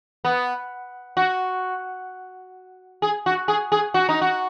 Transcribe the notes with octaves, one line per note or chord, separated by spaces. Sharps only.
B3
F#4
G#4
F#4
G#4
G#4
F#4
D#4
F#4